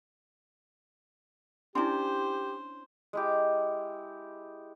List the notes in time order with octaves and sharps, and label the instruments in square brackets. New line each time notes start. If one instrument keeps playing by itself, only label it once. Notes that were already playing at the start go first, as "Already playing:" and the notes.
[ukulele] C#4 D4 [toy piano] E4 G#5 C6 [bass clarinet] G4 [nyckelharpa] C5
[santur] G#3 E4 G4